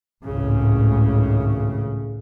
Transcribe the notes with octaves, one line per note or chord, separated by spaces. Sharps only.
G#1 C#2 A2 C#3